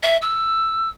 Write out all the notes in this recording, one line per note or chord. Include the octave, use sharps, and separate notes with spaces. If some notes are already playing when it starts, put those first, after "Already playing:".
E5
E6